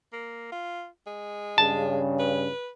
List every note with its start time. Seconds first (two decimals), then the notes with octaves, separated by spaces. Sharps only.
0.13 A#3
0.52 F4
1.07 G#3
1.58 G2 C#3 A5
2.20 B4